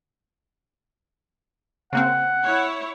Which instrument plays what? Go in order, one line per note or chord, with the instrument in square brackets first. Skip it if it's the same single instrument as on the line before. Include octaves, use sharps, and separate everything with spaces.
[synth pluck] C#3 A#3 C4 [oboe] F#5
[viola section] E4 C#5